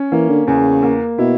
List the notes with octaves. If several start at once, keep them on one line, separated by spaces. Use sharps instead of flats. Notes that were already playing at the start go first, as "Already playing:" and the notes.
Already playing: C#4
E3 A#3
D3
E2 C#3
A#3
B2 E4